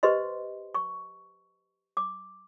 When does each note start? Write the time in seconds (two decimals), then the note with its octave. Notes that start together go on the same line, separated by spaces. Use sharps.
0.03 G4 B4 C5 D#5 C6
0.75 C#6
1.97 D6